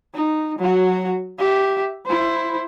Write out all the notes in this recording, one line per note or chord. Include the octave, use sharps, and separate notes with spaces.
D#4
F#3 F#4
G4 E5
E4 C5